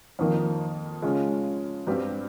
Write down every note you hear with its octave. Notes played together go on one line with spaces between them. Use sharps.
F2 D#3 A#3
C#3 G#3 C#4 F4
G2 G3 C4 G4